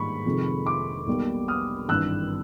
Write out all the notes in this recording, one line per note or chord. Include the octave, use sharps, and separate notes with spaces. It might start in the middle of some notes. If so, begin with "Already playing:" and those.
Already playing: G#2 D#3 G3 A#3 B5 C#6
F1 F2 C3 D#3 G#3
C6 D6
B1 B2 G3 A#3
D#6 F6
G#1 G2 E3 G3 E6 F#6